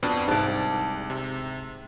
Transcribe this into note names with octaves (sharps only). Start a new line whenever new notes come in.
F2 B2 D4
C2 G#2 D5 A5
C3